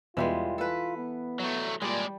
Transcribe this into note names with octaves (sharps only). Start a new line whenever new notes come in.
E2 B2 E3 G3 G#3 F4
F4 A4 B4
B3
F#3 A3
A#2 G3 G#3 D5